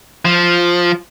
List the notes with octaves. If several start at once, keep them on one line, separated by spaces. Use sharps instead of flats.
F3